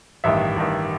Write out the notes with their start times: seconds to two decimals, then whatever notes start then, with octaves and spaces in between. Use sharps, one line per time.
0.24 A1 G2 D#3 E5
0.56 A1 G2 D#3